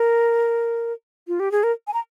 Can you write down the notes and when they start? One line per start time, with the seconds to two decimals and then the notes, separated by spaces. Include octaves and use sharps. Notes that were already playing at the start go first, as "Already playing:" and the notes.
Already playing: A#4
1.28 F4
1.40 G4
1.52 G#4
1.63 A#4
1.87 G#5
1.94 A#5